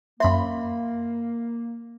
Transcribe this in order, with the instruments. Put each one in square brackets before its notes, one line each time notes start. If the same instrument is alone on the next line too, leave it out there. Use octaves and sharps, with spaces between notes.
[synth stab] F#2 B5 C6 [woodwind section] A#3 [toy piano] E5